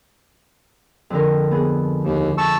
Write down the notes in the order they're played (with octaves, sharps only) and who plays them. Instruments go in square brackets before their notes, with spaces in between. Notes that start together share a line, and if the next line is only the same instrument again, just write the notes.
[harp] F2 D3 A#4
B3 G#4
[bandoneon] D#2
A5 C#6 E6